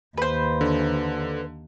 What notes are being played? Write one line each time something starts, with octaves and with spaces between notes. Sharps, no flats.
D#2 B4 C5
D3